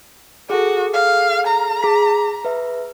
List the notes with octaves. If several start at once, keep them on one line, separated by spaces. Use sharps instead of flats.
F#4 G#4 A4
F5
A#5
G#4 B6
B4 E5